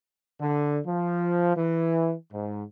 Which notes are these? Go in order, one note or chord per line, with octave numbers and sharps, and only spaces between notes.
D3
F3
E3
G#2